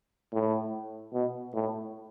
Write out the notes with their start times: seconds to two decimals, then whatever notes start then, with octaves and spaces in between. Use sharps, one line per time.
0.33 A2
1.13 B2
1.54 A2